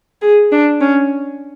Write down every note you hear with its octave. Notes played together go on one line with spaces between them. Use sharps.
G#4
D4
C#4